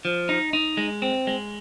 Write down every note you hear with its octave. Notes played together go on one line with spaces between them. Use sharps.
F3
D#4
D#4
G#3
C4
G#3